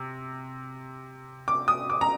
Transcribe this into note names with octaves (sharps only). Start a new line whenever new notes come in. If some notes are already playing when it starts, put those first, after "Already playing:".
Already playing: C3
D6
D#6
D6
A#5